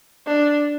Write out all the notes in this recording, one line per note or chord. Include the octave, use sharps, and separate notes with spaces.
D4